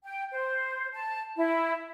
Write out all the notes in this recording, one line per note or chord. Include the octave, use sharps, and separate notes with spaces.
G5
C5
A5
E4